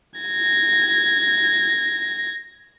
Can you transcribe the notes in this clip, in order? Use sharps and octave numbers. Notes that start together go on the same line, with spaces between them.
G#6 A#6